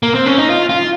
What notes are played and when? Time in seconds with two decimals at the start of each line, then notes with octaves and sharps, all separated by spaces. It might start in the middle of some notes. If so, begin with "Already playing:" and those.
0.03 A#3
0.15 C4
0.26 C#4
0.39 D#4
0.50 F4
0.69 F4